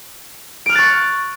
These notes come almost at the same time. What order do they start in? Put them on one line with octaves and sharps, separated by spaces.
D7 F6 F#6 A6 C#6